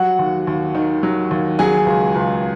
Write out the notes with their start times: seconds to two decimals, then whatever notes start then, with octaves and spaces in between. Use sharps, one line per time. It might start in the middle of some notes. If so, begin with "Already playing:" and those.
Already playing: F#3 F#4 F#5
0.19 D#2
0.47 D#2
0.75 D#3
1.03 F#3
1.31 D#2
1.59 F#3 G#4 G#5
1.86 C#2
2.15 C#2